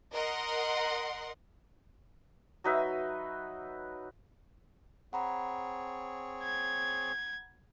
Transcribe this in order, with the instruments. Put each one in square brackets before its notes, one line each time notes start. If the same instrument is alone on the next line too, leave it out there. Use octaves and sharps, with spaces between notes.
[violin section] A#4 D#5 F#5 C6
[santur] F#3 D#4 B4 E5
[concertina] C4 G#4 C#5 [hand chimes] F#5 A#5 B5
[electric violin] G#6